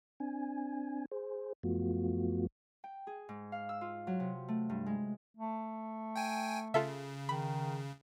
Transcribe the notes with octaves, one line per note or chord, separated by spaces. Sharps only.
C4 D4 G#5
G#4 C5
F#2 F3 A3 B3 F4 F#4
G5
G#4
G#2
F5
E6
F4
F#3
C3
A3
G2
G#3
A3
G5 G#5
C#3 F4 A4 E5
D#3 B5